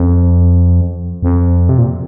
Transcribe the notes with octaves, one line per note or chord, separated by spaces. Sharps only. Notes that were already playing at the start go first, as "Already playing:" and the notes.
Already playing: F2
F2
C3
A#2